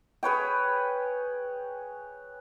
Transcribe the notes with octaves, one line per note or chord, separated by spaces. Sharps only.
G#4 B4 C#5 G5